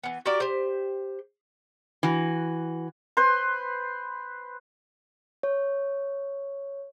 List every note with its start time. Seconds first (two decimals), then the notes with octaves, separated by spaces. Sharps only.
0.04 E3 B3
0.26 F#4 G4 A#4 D5
0.40 G4 C5
2.03 E3 F#4
3.17 B4 C5 C6
5.43 C#5